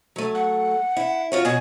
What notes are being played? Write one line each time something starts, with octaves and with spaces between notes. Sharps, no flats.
F#3 A3
F#5
E4
F4 F#4 C#5
B2 F#4 G#5